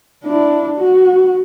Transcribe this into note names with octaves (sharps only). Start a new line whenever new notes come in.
D4 E4
F#4